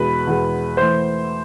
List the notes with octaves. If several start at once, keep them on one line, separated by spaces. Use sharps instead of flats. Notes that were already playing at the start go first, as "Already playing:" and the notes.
Already playing: E2 B2 G#3 B4 B5
E2 B2 G#3
E3 A3 C5 C6